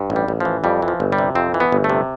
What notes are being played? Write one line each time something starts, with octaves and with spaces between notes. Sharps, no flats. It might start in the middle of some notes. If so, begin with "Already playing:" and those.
Already playing: G2
A1
G3
A1
E3 F3
F2 G3
E3
F3
G1
G3
C3
F2 C4
E3
B3
G1
A3
C3